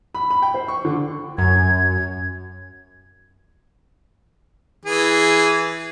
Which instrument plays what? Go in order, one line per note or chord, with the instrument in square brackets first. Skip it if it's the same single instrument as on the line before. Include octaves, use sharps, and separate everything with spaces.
[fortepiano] B5
B5
G5
C5
C#6
D3
[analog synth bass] F#2 [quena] G#6
[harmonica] E3 G#4